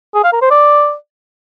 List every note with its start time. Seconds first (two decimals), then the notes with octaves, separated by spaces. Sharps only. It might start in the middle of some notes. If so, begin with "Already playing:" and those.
0.15 G#4
0.24 F5
0.33 A#4
0.42 C5
0.51 D5